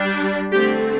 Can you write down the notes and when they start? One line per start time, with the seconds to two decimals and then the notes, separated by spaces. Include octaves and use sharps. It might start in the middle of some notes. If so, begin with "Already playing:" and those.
Already playing: G3 D4
0.52 D3 A3 C4 G4